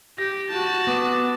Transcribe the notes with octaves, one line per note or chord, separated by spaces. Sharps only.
G4 A#6
F#4 A5
B3 D6